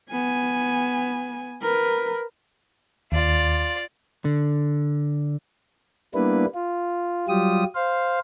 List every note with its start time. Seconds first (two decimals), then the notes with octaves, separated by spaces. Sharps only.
0.10 B3 G#5
1.62 A#4 B4
3.12 D#2 F4 D5
4.25 D3
6.14 G3 A#3 B3 D4 E4 B4
6.55 F4
7.28 F#3 G3 F4 G4 D#6
7.75 C5 F5